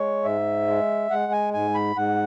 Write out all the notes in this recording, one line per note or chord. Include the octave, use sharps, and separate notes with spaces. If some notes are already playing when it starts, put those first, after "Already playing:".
Already playing: G#3 C#5
G#2 E5
G#3
G#3 F#5
G#5
G#2 G#5
B5
G#2 F#5